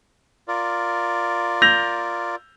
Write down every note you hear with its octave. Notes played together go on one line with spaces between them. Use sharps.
F4 A#4 D5
G6 A#6 F7